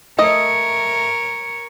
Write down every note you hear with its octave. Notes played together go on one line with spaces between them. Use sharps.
A3 A#4 C#5 D#5